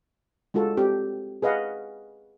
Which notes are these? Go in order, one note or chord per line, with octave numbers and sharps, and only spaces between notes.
G#3 F4 F#4 A4
C4 G4
G#4 B4 D#5 F5 F#5